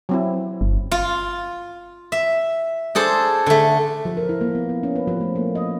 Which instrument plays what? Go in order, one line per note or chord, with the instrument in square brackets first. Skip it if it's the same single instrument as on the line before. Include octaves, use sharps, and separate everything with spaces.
[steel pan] F#3 C4 E4
[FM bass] G1
[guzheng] F4
E5
D4 G#4 A4 C5
D3 A3
[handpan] F3
A#4
E4
A#3
B3
B3
C#4
B4
F3
A3
A#3
D#5